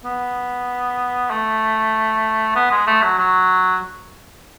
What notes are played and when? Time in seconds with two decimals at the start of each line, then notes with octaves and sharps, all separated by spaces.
0.05 B3
1.30 A3
2.55 B3
2.71 G#3
2.87 A3
3.02 F#3
3.18 F#3